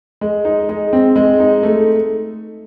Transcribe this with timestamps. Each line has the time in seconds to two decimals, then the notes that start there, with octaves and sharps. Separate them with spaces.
0.21 G#3
0.45 D#4
0.69 G#3
0.93 C4
1.16 G#3
1.40 D#4
1.63 A3